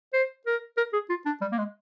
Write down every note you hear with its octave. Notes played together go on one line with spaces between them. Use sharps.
C5
A#4
A#4
G#4
F4
D4
G3
A#3
G#3